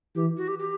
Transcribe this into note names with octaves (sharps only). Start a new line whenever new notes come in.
E3 G4
F#4
G4
G4